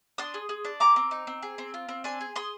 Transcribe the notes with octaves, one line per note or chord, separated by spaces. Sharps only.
D4 C6 D#6
G#4
G#4
D4
G4 A#5 D6
C4
D#4
C4
G#4
C4
F4
C4
D4 G#5 C6
G#4
G#4 C6 D#6